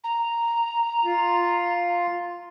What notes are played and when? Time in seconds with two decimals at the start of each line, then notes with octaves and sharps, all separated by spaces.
0.04 A#5
1.05 F4